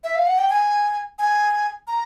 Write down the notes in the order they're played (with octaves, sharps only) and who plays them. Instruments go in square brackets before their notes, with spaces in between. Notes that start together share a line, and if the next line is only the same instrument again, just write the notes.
[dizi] E5
F5
F#5
G5
G#5
G#5
A#5